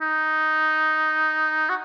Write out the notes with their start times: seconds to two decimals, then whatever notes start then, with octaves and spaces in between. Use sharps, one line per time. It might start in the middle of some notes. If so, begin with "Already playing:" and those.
0.01 D#4
1.69 F#4